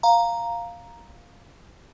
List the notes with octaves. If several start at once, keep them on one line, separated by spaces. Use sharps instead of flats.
F5 A#5